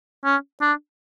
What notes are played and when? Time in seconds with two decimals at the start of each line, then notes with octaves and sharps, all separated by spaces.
0.24 C#4
0.61 D4